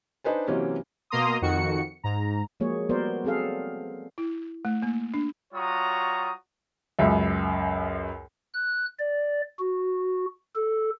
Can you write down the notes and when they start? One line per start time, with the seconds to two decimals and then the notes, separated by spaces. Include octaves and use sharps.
0.24 D4 D#4 B4 C5 G#5
0.48 C3 E3 F#3 A#3 C4 C#4
1.10 B2 A#3 A#5 C6 D#6
1.42 F2 D#3 F#4 C#7
2.03 G#2 A#5
2.60 F3 F#3 G#3 A#3 G#4 C#5
2.89 F#3 G3 B3 A#4 C5 D5
3.25 F#3 C4 G#4 A4 F5
4.18 E4
4.65 A3
4.82 A#3
5.14 D4
5.53 G3 F4 F#4 C#5 A#5 D#6
6.99 C#2 F#2 E5
8.54 F#6
8.99 D5
9.59 F#4
10.56 A4